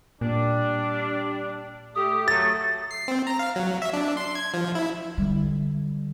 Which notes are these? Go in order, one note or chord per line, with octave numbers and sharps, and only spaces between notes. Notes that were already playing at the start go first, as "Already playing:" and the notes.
A#2 G3 D4
A3 G4 D#6
F#3 A3 A6
C7
C4
A#5
F5
F#3
E5
D4
C6
G#6
F3
E4
D3 G3